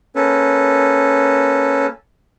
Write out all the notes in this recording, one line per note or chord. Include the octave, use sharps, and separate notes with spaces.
A#3 C#4 A4 B4